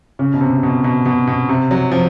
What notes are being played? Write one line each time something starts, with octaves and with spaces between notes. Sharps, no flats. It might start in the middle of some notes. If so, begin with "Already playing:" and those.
C#3
B2
C3
B2
B2
B2
B2
C3
F#3
F3